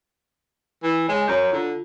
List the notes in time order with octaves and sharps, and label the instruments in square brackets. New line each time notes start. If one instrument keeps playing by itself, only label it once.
[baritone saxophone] E3
[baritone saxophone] G#3 [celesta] C#5 G#5
[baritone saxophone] F#2 [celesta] C#5 A#5 G6
[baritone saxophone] D3 [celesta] F4